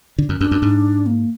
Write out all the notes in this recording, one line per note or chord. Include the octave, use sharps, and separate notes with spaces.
D3
F#2
F#2 D4
F#2
G#2
A#3